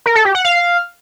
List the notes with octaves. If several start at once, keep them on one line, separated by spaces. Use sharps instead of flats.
A#4
A4
G4
F#5
F5